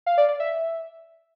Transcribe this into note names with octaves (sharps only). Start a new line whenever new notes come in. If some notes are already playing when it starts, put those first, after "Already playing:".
F5
D5
D5
E5